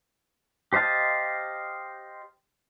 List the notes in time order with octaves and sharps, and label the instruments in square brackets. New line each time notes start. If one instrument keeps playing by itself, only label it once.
[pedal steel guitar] G4 C5 D#5 F5 A5